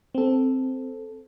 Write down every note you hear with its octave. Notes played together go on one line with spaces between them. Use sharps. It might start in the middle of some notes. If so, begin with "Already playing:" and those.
C4 A4